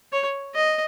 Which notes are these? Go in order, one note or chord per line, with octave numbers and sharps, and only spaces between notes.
C#5
D#5